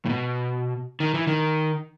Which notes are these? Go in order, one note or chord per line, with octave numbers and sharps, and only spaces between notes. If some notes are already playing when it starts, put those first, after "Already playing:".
A2
B2
D#3
E3
D#3